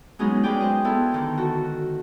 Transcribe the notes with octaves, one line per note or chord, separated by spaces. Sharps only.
F#3 G#3 B3 C#4 D#4 G#4
G#3 C#4 G#4 B4 D5 G5
C5 D#5
B3 E4 A4
D3 D#3 D4
F#4 A4